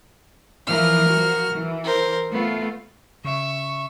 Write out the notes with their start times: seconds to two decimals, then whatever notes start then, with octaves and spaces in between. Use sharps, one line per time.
0.67 E3 F3 A#4 F6
1.10 F3 F#4
1.52 E3
1.84 A#4 C5
2.32 A3 B3 F4
3.25 C#3 E5 C#6